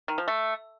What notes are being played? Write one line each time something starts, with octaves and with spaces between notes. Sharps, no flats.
D#3
F3
A3